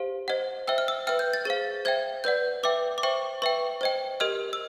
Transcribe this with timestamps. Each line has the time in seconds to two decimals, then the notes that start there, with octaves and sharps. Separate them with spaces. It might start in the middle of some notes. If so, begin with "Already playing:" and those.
Already playing: G4 C5 F5
0.28 C5 D#5 F#5
0.68 C5 E5 G5 E6
0.78 F6
0.88 E6
1.07 B4 E5 G5 F6
1.19 G6
1.34 A6
1.45 G#4 C5 F5 A6
1.85 C5 E5 G5 G#6
2.24 B4 D5 F#5 G6
2.63 B4 E5 G5 D6
2.98 D6
3.03 C5 E5 G5 C#6
3.42 B4 E5 G5 C#6
3.81 C5 D#5 G5
4.20 G4 A#4 D#5 F6
4.53 E6